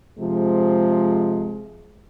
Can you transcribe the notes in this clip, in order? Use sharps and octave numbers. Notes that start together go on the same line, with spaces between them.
C3 F3 G#3